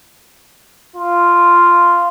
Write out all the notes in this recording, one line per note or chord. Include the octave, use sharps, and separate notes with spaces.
F4